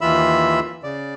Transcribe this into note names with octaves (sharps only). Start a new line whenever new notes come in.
D#2 E3 F4 E5 B5 E6
C#3 D5